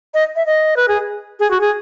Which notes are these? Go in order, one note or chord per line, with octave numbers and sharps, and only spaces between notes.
D#5
E5
D#5
B4
G#4
G#4
F#4
G#4